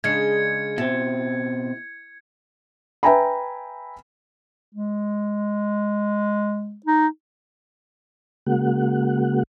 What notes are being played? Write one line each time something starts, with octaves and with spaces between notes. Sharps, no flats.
C#3 G#3 D4 G#6 C#7
B2 C4 E4
B4 E5 G5 G#5 A#5 B5
G#3
D#4
C#3 G#3 A#3 F#4 F#5